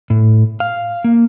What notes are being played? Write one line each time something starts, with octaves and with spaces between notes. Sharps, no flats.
A2
F5
A#3